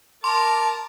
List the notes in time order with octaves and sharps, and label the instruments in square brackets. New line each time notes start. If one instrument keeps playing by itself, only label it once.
[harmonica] A#4 D6 [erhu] A5 [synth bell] C6